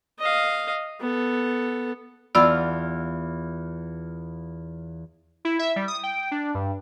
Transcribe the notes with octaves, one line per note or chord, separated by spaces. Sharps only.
D#5 F5
B3 A4
E2 F4 D5 B5 E6 F6
E4
E5
G3
D#6
G5
D4
G2